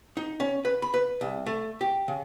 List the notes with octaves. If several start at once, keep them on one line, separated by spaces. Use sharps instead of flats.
D#4
C#4
B4
B5
B4
C2
A3
G4
C#3